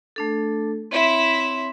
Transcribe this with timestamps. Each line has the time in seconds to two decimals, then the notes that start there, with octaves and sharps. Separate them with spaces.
0.16 A3 D4 A4
0.91 C4 E4 C#5 E5 C6